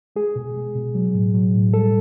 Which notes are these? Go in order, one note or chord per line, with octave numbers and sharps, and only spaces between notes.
G#3 G#4
B2
G#3
B2
F#3
A2
F#3
A2
G3 A4